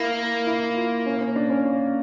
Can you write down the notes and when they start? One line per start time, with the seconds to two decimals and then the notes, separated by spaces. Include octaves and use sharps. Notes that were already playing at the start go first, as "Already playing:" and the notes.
Already playing: A#3 E4
0.47 E4
0.76 F4
1.06 C#4
1.21 C#4
1.36 D4
1.50 C#4
1.65 C#4